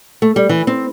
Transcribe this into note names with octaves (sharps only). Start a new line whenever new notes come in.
A3
G3
E3
C4